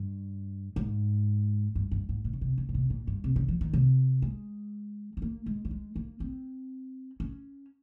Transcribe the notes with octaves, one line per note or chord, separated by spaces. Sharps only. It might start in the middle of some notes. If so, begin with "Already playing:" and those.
Already playing: G2
G#2
G2
G2
G#2
A#2
C#3
C3
C#3
A#2
C3
A#2
G2
C3
C#3
F3
D#3
C3
G#3
C4
A#3
G#3
G3
G#3
A#3
C4
C#4